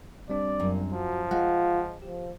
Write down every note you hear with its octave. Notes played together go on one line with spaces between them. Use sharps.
G3 C4 D4 D5
F#2 A#2
F3 F#4
G#3 F4 F#5
F3 G4